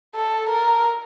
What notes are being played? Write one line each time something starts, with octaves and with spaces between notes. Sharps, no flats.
A4
A#4